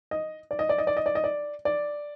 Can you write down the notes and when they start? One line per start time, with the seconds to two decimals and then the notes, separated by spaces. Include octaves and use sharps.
0.11 D#5
0.51 D5
0.59 D#5
0.69 D5
0.78 D#5
0.87 D5
0.97 D#5
1.06 D5
1.15 D#5
1.24 D5
1.65 D5